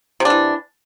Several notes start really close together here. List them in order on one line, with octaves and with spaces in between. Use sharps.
C3 D4 E3